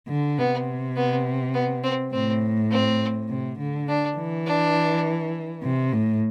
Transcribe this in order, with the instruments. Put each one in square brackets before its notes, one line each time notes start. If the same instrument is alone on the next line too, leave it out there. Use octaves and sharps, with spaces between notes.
[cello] D3
[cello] C3 [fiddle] B3
[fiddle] B3
B3
C4
[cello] A2 [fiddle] C4
[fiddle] C4
[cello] C3
D3
[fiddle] D4
[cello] E3
[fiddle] D4
[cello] C3
A2